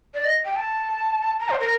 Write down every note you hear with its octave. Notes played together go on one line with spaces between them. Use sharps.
D5
D#5
G5
A5
A#5
C5
A#4